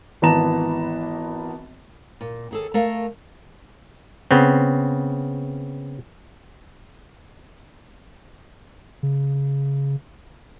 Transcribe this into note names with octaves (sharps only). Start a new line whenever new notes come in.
G#1 E3 B3 A5 A#5 E7
A#2
D#2 G#4 A4
A3 A#4 F5
C#3 B3 C4
C#3